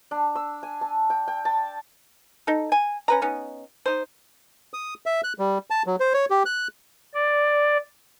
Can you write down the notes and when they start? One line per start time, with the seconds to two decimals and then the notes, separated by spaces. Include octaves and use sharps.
0.11 D4
0.36 E6
0.63 G#5
0.81 A5
1.10 G5
1.28 G5
1.45 A5
2.47 D#4 A4
2.72 G#5
3.08 C#4 B4 A#5
3.22 B3 C#4 D#4
3.86 D#4 C5
4.74 D#6
5.06 E5
5.24 F#6
5.39 G3
5.70 A5
5.86 F#3
6.00 C5
6.14 C#5
6.30 G4
6.46 F#6
7.14 D5